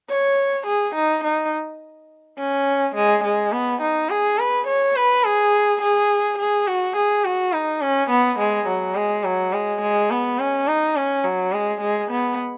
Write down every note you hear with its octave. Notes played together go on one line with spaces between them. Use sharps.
C#5
G#4
D#4
D#4
C#4
G#3
G#3
B3
D#4
G#4
B4
C#5
B4
G#4
G#4
G#4
F#4
G#4
F#4
D#4
C#4
B3
G#3
F#3
G#3
F#3
G#3
G#3
B3
C#4
D#4
C#4
F#3
G#3
G#3
B3